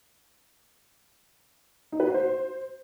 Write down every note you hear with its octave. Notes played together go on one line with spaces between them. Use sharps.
D#4
B4
F#4
C5